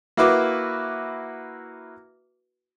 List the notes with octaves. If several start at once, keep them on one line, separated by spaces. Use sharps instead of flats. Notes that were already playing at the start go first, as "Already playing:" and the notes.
A#3 E4 F#4 B4 D6